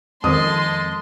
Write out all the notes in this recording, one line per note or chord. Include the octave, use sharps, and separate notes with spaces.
F2 D#3 G#3 A5 C6 D#6